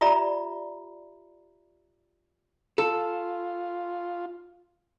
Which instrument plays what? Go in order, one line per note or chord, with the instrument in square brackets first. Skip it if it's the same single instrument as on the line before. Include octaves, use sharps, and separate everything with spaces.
[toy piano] F4 G4 D5 E5 A#5 B5
[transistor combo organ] F4 [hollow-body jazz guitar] A4